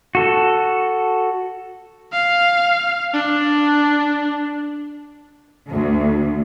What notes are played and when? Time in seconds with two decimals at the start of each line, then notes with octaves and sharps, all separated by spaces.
0.15 F#4 A4
2.13 F5
3.13 D4
5.69 D2